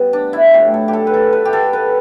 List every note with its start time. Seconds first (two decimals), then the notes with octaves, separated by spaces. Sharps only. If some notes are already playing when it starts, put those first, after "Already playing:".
Already playing: C#3 G3 B3 G4
0.13 D4
0.33 E4
0.53 A2 F#3 A3 G4
0.74 A4
0.88 G4
0.93 A4
1.07 B4
1.14 A4
1.33 B4
1.45 G4
1.53 A4
1.73 B4